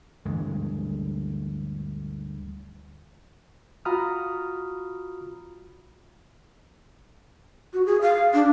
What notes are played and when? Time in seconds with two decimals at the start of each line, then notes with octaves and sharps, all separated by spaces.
0.25 D2 G2 E3 G#3
3.85 F4 F#4 A#5 B5 D#6 F6
7.73 F#4
7.86 G#4
8.02 F5
8.34 D4